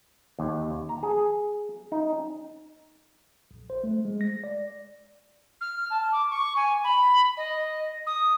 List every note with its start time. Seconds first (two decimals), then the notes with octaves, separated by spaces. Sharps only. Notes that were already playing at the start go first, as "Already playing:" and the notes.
0.39 D#2
0.89 A#5
1.03 G#4
1.92 D#4
3.51 A#1
3.70 C5
3.84 A3
4.05 G#3
4.21 A#6
4.44 D5
5.61 F6
5.90 A5
6.12 D6
6.30 C#6
6.56 G#5
6.84 B5
7.37 D#5
8.06 D#6